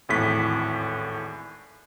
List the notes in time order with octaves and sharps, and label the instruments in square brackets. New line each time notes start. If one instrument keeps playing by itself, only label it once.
[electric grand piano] G#1 E2 A2 B6